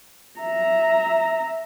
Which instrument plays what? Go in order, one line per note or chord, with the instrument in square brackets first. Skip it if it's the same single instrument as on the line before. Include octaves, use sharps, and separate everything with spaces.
[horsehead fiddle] E5 A#5